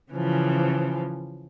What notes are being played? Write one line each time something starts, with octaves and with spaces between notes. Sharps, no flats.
C#3 E3 F3